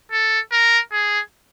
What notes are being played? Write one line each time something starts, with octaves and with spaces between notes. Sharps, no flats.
A4
A#4
G#4